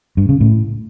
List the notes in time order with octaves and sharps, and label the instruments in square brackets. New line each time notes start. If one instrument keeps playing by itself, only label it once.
[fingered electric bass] G2
C#3
A2